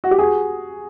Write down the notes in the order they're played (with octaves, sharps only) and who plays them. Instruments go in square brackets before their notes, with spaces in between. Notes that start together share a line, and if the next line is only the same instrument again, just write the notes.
[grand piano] F#4
G4
F#4 G#4